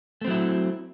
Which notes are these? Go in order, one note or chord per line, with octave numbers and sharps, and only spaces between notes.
F#3 A3 C4 E4